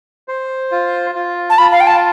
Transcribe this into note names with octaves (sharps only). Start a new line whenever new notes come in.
C5
F4
F4
A5
F4 B5
F5
G5
A5